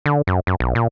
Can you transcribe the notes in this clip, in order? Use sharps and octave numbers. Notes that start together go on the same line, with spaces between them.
D3
F#2
F#2
B1
A#2